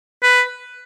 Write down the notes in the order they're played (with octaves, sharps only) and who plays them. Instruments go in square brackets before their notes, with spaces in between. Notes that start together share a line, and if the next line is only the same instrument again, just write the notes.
[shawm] B4